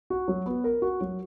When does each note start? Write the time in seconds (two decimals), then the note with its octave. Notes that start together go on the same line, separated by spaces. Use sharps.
0.10 F#4
0.28 F#3
0.46 B3
0.64 A#4
0.82 F#4
1.01 F#3